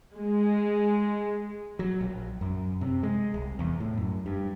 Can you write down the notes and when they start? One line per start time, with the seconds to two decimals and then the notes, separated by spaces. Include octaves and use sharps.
0.17 G#3
1.79 F#3
2.01 A#1
2.41 F#2
2.81 C3
3.03 G#3
3.34 C2
3.59 E2
3.80 A2
3.98 F#2
4.26 G2